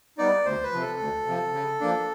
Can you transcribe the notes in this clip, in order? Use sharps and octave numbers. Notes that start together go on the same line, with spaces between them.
G3 B3 D#4 D5
D2 C5
B4
C3 F3
A4
D2
C3 F3
C#3
F3 A#3 D4